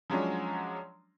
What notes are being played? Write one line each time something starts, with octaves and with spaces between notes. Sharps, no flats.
F3 F#3 G#3 C#4 D4